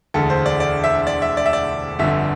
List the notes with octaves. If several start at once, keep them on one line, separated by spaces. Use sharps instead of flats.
E1 D2 D3 A4
C5
D5
D5
E5
D5
E5
D5
E5
D5
G1 F2 D3 E5